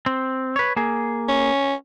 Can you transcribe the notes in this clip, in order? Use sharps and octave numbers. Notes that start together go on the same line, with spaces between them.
C4
B4 C#5
A#3 G#4
C#4